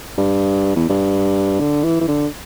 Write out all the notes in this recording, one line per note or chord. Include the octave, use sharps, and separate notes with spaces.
G2
E2
G2
D3
E3
E3
D3